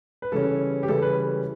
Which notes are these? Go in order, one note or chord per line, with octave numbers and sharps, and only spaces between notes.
B4
C#3 E3 G3 C#4 A4
G4
C#3 E3 G3 C#4 A4
B4